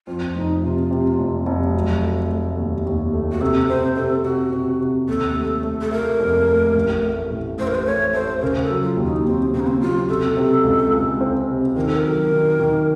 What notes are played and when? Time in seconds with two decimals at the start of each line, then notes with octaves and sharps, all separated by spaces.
0.07 F2 F4
0.35 F1 D#4
0.63 C3 F4
0.91 C3
1.19 F1
1.46 F1
1.74 F#3
2.02 A3
2.30 A3
2.58 D#2
2.86 D#2
3.13 A3
3.32 F#4
3.41 C3 A4
3.69 C3 C5
3.96 C3 A4
4.24 C3 F#4
4.52 C3
4.81 C3
5.08 D#2 A4
5.36 A3
5.64 A3
5.81 A4
5.91 A3 A#4
6.20 F1
6.47 A3
6.75 A1
7.03 A3
7.30 A2
7.58 A1 C5
7.67 A#4
7.75 C5
7.86 A3 C#5
8.14 A3 C5
8.41 C#3 A#4
8.63 A4
8.70 F#3
8.83 F4
8.97 D#2
9.05 D#4
9.25 D#2 C4
9.53 C#3 C4
9.60 A#3
9.67 C4
9.81 F#3 F4
10.09 C3 A4
10.37 C3
10.64 C#2
10.93 C#2
11.21 C4
11.48 C3
11.76 D#3 A#4
11.85 A4
11.96 A#4
12.04 F#3
12.31 D#3
12.59 D#3